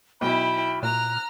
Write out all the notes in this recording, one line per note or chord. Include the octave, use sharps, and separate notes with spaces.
B1 E4 G5 B5
A#2 A#5 F6 F#6